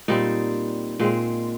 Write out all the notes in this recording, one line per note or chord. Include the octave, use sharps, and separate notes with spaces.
A#2 G3 C4 D#4
A#2 G#3 C4